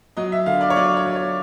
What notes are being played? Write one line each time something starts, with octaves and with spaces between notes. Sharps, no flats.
F#3 D#5
E5
D3 F5
D5
C#5
F#3 D5
C#5
F#3
C#5